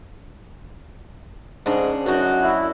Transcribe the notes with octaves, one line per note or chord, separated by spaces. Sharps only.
G#2 C#3 D4
F#2 D4 D#4 F#4
E4